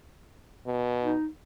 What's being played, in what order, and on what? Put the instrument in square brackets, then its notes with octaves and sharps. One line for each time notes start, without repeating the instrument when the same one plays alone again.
[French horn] B2
[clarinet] D#4